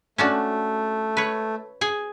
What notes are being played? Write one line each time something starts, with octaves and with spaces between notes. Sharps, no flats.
A3 C#4 D4 F#4
B4 C#5
G#4 G#5